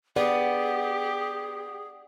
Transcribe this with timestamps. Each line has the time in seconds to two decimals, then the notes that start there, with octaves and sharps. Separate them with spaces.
0.16 B3 G4 G#4 D5